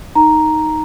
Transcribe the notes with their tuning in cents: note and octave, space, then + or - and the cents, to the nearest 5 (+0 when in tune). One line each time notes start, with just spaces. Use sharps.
D#4 +0 A#5 +0